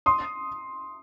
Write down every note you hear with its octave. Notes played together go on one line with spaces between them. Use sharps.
C6 D#6